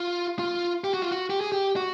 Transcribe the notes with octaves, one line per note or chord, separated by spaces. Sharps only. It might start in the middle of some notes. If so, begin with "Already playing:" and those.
Already playing: F4
F4
G4
F#4
F4
F#4
G4
G#4
G4
F#4